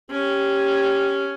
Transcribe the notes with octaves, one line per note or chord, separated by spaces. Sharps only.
C#4 G4